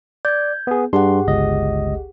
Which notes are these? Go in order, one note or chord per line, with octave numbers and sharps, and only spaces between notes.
D5 G6 G#6
B3 G#4
G2 D4 G4 G#4 F#5 C6
G1 C#2 D#5